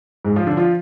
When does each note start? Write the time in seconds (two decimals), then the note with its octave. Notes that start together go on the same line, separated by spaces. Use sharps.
0.25 G#2 G#3
0.36 F3 F4
0.47 D3 D4
0.57 F3 F4